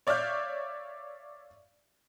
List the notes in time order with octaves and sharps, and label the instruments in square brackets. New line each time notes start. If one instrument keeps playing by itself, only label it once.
[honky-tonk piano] C#5 D5 E5 F5 F6 G6